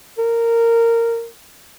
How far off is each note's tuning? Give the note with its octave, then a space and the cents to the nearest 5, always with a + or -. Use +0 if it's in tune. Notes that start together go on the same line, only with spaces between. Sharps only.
A#4 -15